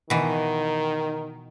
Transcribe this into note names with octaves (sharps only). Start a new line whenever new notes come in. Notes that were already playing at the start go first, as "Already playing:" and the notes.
B2 D#3 E3